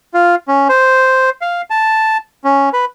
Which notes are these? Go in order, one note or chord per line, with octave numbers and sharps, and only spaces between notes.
F4
C#4
C5
F5
A5
C#4
B4